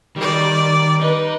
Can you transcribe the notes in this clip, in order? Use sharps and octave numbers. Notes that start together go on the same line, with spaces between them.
D#3 G3 D5
D#4 B4